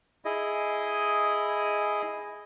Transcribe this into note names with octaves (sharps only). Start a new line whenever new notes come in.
E4 G#4 D#5